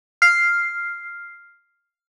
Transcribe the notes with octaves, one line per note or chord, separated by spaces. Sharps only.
F6 C7